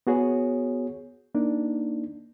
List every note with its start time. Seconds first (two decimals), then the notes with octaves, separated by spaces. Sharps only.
0.07 B3 F#4 G#4 C#5
1.35 A#3 D4 D#4